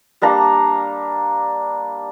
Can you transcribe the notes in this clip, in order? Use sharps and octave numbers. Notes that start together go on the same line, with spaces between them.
G3 A#3 D4 A#5